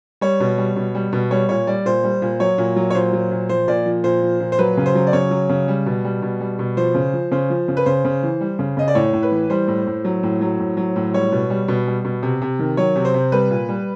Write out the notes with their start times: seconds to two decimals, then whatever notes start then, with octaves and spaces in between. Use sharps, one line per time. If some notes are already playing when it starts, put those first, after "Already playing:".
0.21 G3 C#5
0.40 B2
0.58 G3
0.76 B2
0.95 G3
1.13 B2
1.31 G3 C#5
1.49 A#2 C#5
1.67 G3 D5
1.85 A#2 C5
2.04 G3
2.22 A#2
2.40 F#3 C#5
2.58 A#2
2.76 F#3
2.90 C#5
2.95 A#2 C5
3.13 F#3
3.31 A#2
3.49 F3 C5
3.68 A#2 D5
3.86 F3
4.04 A#2 C5
4.22 F3
4.40 A#2
4.52 C5
4.59 F#3 B4
4.77 C#3
4.86 C5
4.95 F#3
5.07 D5
5.13 C#3 C#5
5.31 F#3
5.49 C#3
5.68 G3
5.86 B2
6.04 G3
6.22 B2
6.40 G3
6.59 B2
6.77 F3 C5
6.95 C#3
7.13 F3
7.31 C#3 C5
7.50 F3
7.68 C#3
7.77 B4
7.86 C#3 C5
8.05 C#3
8.23 E3
8.41 G3
8.59 C#3
8.77 C#3 D#5
8.88 D5
8.95 A2 C#5
9.13 A2
9.23 B4
9.32 E3
9.50 G3 C5
9.68 A2
9.87 A2
10.04 F#3
10.23 A2
10.41 F#3
10.59 A2
10.77 F#3
10.96 A2
11.14 G3 C#5
11.32 B2
11.50 G3
11.68 B2
11.87 G3
12.05 B2
12.23 C3
12.42 C3
12.59 D#3
12.77 F#3 C#5
12.96 C3
13.05 C5
13.14 C3
13.32 G3 B4
13.50 A#2
13.69 G3